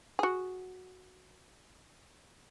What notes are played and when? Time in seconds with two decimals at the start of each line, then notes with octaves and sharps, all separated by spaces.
0.19 F#4 G#4